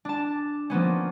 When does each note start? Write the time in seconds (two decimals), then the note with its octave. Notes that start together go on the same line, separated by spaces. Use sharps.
0.05 D4 A5
0.70 F3 A#3 B3 C#4